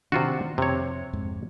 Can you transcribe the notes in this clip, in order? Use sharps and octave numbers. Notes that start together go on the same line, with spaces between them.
C3 D#3 D4 F4 F#4
F2 C3 C#5
F2 G#2